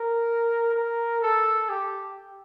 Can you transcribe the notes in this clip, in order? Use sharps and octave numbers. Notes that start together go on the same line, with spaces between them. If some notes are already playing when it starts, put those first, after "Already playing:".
Already playing: A#4
A#4
A4
G4